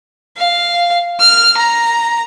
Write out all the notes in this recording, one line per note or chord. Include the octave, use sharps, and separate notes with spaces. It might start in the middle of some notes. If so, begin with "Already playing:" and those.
F5
F6
A#5